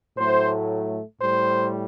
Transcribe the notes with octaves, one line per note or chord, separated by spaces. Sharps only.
A2 F#3 A3 C5
A2 G3 C5